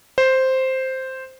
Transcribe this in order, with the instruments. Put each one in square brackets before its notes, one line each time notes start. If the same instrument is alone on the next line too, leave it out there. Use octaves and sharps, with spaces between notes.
[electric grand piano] C5